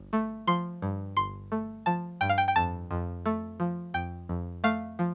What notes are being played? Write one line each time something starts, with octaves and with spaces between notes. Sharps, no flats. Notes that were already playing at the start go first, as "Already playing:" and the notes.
Already playing: G1
A3
F3 C6
G2
G1 C6
A3
F3 A5
G2 G5
F5
G5
G5
F2 A5
F2
A3
F3
F2 G5
F2
A3 F5
F3